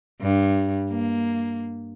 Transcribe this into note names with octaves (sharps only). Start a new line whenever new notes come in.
G2
A#3